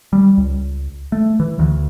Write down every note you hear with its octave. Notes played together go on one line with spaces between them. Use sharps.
G3
C#2
A3
E3
D2